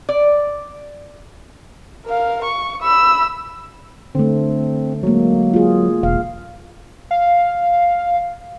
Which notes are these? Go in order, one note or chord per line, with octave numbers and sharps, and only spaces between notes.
D5
A#4 F5
C#6
B5 E6
D3 A3 C4
F#3 G#3 A#3
F4 G#4
E1 F5
F5